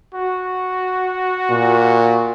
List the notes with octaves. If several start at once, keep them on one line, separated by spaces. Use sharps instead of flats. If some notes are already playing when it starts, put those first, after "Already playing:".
F#4
A#2